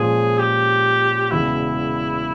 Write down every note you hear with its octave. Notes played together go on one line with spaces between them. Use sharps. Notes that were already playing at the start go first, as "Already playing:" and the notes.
Already playing: A#2 F3 G#3 C#4 G#4
G4
E1 E2 C#3 E4